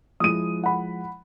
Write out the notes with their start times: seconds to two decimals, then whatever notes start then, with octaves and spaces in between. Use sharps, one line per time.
0.20 F3 G#3 E4 D#6 D#7
0.64 F#5 B5